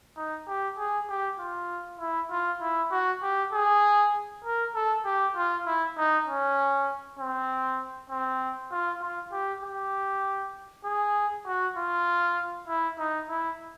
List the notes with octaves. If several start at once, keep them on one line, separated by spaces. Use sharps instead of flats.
D#4
G4
G#4
G4
F4
E4
F4
E4
F#4
G4
G#4
A#4
A4
G4
F4
E4
D#4
C#4
C4
C4
F4
F4
G4
G4
G#4
F#4
F4
E4
D#4
E4